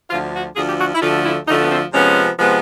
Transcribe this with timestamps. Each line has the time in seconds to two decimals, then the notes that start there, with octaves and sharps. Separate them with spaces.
0.11 D2 D3 F3 F4
0.34 F#4
0.56 D2 D3 F3 G#4
0.68 G4
0.79 F#4
0.95 E4
1.01 D2 D3 F3 A3 F4
1.25 E4
1.47 D2 D3 F3 A3 D#4
1.61 B3
1.70 C4
1.93 C3 F3 G#3 B3 C#4
2.38 C3 F3 G#3 B3